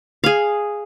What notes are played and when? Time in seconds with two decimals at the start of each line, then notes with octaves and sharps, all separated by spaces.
0.24 G#4 F5